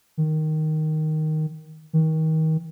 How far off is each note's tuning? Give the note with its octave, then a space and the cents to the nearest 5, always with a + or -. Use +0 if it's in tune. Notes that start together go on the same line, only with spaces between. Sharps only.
D#3 +0
D#3 +30